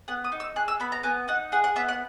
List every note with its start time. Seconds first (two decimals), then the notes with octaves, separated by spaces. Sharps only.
0.08 B3 F#5
0.24 D#6
0.32 D#4
0.40 E6
0.56 G#4 F#6
0.68 E6
0.80 B3 B5
0.92 A#5
1.03 B3 G#5
1.28 D#4 F#5
1.52 G#4 F#5
1.64 F#5
1.76 B3 E5
1.89 F#5